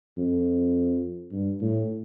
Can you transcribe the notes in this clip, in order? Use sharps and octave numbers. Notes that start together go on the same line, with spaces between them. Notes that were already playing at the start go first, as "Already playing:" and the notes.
F2
G2
A2